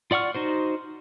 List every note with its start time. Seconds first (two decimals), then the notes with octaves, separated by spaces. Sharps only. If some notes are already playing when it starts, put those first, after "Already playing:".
0.11 F4 D5 F#5 C#6 F6
0.35 D#4 F#4 C5